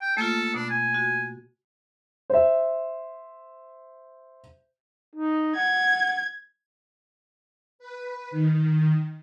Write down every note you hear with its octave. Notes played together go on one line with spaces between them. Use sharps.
G5
A3 A#3 F4 A4
B2 B3 D4
G#5
F#4
C5 E5
D#4
F#5 G#6
B4
D#3